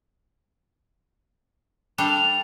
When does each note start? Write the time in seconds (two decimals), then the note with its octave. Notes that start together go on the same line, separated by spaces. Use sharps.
1.98 G3 D4 A4 F7